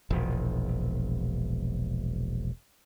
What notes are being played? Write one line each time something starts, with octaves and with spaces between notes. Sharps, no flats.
E1 A#1